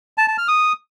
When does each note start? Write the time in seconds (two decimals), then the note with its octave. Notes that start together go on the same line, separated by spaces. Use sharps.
0.18 A5
0.28 A5
0.38 F6
0.48 D#6